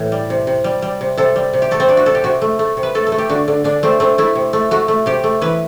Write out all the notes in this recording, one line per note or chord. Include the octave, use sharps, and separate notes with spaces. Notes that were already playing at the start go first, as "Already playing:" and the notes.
Already playing: A2 E3
G3
C3
C3
G3
G3
C3
C3 A4
G3
C3
G4
A3 A4
C4
C3 D4
F#4
C3 A4
G4
C3 F#4
A3
A3
C3
B4
A3 A4
A4
A3
G4
D3 F#4
D3
D3 D4
A3 C4
A3 C4
A3 E4
C3
A3
A3 F#4
A3
C3 G4
A3
E3 B4